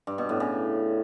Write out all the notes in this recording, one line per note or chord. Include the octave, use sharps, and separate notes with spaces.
G2
B2
A2
C#3